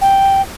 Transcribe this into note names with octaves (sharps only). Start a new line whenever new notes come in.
G5